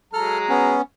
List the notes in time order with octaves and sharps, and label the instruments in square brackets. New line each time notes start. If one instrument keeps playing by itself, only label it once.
[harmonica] F#3 G#3 A#5 [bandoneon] A4 F6
[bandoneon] B3 C#4